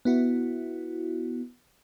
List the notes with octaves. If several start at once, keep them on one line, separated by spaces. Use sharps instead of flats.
B3 E4 F#4